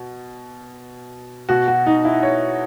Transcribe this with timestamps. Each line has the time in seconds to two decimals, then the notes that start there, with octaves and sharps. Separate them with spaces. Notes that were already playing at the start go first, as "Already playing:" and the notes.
Already playing: B2
1.49 B2 F#4
1.68 F#4
1.87 D#4
2.05 E4
2.23 C#5